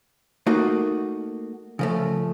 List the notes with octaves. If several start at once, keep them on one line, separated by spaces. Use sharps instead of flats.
A3 A#3 D#4 F#4
C#3 F3 A3